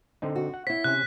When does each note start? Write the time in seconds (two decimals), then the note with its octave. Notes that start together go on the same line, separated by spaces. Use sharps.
0.22 D3 C4 D#4
0.36 F#4
0.54 F#5
0.67 E4 C#5 B6
0.84 C3 C#4 F#6